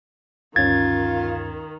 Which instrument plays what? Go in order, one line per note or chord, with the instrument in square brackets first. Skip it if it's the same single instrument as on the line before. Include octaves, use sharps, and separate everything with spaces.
[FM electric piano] D2 G2 C#4 [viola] D#3 [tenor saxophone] F4 [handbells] G#6 A6